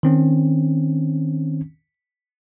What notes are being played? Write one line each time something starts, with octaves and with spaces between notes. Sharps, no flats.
D#3 C4 C#4